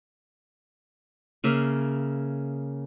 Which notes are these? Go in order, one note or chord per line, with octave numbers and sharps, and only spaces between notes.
C#3 A#3 E5